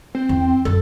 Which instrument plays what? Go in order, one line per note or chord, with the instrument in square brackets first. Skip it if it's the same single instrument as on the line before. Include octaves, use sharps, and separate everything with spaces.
[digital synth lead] C4
[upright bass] E2
[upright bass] F#2 [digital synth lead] A4